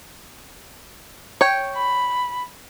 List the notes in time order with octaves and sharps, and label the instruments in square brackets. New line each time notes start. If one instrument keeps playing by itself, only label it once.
[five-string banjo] C#5 G5
[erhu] B5